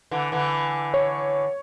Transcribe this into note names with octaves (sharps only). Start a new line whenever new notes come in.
D3 E3
D3 E3
C#5